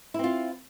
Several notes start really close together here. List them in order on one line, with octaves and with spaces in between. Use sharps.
E4 C4 F4